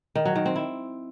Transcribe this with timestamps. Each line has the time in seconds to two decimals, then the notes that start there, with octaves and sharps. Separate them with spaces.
0.15 D#3
0.25 F#3
0.36 D#3
0.46 C4
0.56 E4